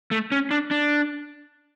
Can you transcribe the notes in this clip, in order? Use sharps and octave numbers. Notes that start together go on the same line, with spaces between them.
A3
C#4
D4
D4